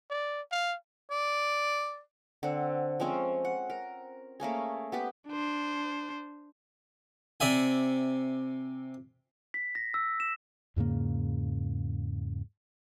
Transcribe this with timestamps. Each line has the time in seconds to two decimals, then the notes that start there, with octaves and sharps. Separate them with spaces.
0.10 D5
0.51 F5
1.11 D5
2.43 D3 C4 F#5
3.00 F3 G#3 C4 C#4
3.45 F#5
3.70 A#4
4.40 A3 A#3 C#4 G#4
4.92 B3 G4 B4
5.28 D4 C5
7.40 C3 D5 E5 G#5
9.54 B6
9.75 A#6
9.94 E6
10.20 E7
10.76 E2 G#2 C#3 A#3